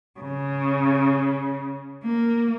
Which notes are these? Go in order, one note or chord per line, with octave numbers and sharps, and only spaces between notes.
C#3
A#3